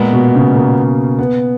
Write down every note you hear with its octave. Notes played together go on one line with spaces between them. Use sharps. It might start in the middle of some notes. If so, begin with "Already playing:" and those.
Already playing: A#2 G#3 B3
B2
C#3
A#3
B3